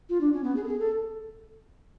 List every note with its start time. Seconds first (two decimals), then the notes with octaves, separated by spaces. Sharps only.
0.09 F4
0.21 D4
0.33 C#4
0.44 B3
0.56 G#4
0.63 A4
0.68 G#4
0.80 A4